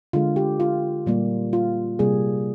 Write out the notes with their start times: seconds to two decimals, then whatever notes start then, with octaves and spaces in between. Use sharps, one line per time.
0.13 D3 G#3 F4
0.36 G4
0.60 F4
1.06 A#2 G3 A#3
1.53 F4
1.99 C3 G3 A#3 G#4